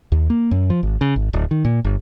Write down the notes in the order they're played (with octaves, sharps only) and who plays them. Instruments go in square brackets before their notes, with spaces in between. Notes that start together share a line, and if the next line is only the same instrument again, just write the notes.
[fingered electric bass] D#2
A#3
F#2
F3
G#1
C#3
G#1
D1
D#3
A#2
G1